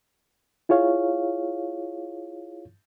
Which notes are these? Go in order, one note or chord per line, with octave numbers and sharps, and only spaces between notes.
E4 F4 G#4 C#5 F5